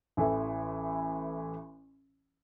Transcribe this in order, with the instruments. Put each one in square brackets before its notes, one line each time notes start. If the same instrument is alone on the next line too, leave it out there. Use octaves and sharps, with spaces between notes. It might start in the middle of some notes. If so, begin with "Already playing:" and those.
[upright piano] A1 E3 E4 A4